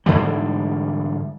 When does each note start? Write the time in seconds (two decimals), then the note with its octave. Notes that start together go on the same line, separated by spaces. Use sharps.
0.06 G#2 D3 E3 G3